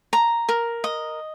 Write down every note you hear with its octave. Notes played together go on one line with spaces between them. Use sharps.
A#5
A#4
D#5